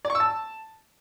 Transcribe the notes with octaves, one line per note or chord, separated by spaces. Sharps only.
D5
C#6
E6
A5